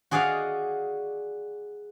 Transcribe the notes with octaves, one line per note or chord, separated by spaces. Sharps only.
F#4 G#4 D5 D#5 F5 F#5